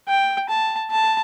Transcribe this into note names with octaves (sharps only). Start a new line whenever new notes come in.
G5
A5
A5